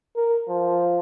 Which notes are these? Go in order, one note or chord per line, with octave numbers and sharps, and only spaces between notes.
A#4
F3